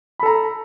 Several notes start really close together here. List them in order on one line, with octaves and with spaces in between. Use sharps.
B5 A4 A#5